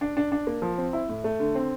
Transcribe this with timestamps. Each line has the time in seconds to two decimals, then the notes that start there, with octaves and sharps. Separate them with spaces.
0.01 D4
0.17 D4
0.32 D4
0.47 A#3
0.62 F3
0.78 C4
0.93 E4
1.09 A2
1.24 A3
1.40 D3
1.55 C4